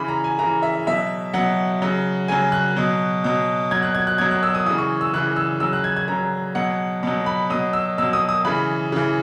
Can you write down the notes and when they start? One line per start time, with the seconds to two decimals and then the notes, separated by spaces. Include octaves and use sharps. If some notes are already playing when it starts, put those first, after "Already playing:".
Already playing: C#3 E3 B5
0.08 A#5
0.24 G#5
0.39 C#3 E3 A#5
0.62 E5
0.87 B2 F#3 E5
1.34 B2 F#3 F#5
1.82 C#3 F#3
2.28 C#3 F#3 G#5
2.52 F#6
2.77 B2 F#3
3.24 B2 F#3
3.71 B2 F#3 G#6
3.83 F#6
3.95 G#6
4.07 F#6
4.18 B2 F#3 G#6
4.31 F#6
4.43 E6
4.55 D#6
4.66 E3 D#6
4.70 C#3
4.78 C#6
5.01 E6
5.13 C#3 E3 F#6
5.36 E6
5.60 C#3 F#3 E6
5.73 F#6
5.84 G#6
5.96 G#6
6.08 C#3 F#3 A#5
6.55 B2 F#3 F#5
7.03 B2 F#3
7.26 B5
7.50 B2 F#3 D#6
7.73 E6
7.98 B2 F#3 E6
8.13 D#6
8.29 D#6
8.45 C#3 E3 B5
8.92 C#3 E3